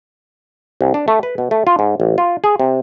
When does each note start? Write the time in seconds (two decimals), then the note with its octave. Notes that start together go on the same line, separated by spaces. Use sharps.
0.81 C2
0.94 D4
1.08 A3
1.23 B4
1.38 B2
1.51 A3
1.67 F4
1.79 G#2
2.00 A1
2.18 F4
2.44 G#4
2.60 C3